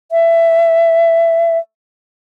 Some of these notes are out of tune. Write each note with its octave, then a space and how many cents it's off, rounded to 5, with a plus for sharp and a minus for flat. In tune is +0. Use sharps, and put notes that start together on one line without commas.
E5 +15